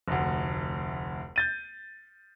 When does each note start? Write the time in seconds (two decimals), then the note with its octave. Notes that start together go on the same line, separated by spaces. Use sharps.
0.08 F1 D2
1.36 G6 A6 D#7